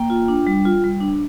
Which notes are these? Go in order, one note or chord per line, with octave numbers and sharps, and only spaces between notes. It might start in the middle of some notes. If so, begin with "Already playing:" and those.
Already playing: A#3 G5
F4
D4
G3
F4
G3
D4